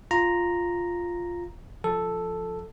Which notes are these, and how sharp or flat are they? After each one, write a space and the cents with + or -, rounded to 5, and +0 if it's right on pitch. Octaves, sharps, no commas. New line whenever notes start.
F4 +0 A#5 +0
F3 +0 A4 +0